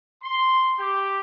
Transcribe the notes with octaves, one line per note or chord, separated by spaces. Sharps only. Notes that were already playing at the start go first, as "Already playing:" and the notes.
C6
G4